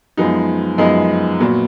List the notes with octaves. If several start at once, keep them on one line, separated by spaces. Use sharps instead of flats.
F#2 F3 G#3 B3 D#4
F#2 F3 G#3 B3 D#4
A#2 F#3 B3